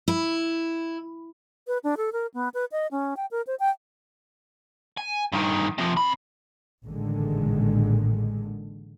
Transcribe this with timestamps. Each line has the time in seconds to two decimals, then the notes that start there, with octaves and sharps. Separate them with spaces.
0.08 E4
1.67 B4
1.84 D4
1.97 A4
2.13 A#4
2.34 B3
2.54 B4
2.72 D#5
2.91 C#4
3.17 G5
3.31 A#4
3.47 C5
3.60 G5
4.97 G#5
5.32 G2 D#3
5.79 C3 F3
5.97 C3 B5
6.84 A1 A#2 D3 D#3 G#3